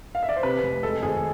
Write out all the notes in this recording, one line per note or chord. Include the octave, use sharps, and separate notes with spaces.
F5
E5
D5
C5
C3 B4
F1
G#3 A4
G#1 G#4